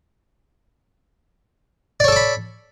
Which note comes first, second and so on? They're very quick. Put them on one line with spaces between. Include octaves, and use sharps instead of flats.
D5 C#5 A4 D6 B5